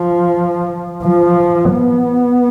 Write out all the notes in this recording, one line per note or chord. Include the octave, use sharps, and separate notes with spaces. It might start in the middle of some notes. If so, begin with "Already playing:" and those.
Already playing: F3
F3
B3